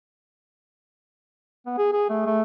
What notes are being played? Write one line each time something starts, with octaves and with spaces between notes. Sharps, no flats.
B3
G#4
G#4
A3
A3